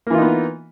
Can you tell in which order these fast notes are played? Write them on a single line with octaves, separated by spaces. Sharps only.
A#3 E3 F4 D#4 B3